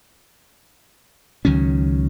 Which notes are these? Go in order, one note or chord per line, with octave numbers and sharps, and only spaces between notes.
C#2 D#3 F#3 C#4